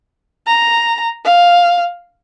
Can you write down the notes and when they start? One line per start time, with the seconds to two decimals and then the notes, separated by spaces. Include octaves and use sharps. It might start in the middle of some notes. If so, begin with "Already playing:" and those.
0.47 A#5
1.25 F5